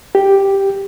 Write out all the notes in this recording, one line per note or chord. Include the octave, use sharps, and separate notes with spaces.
G4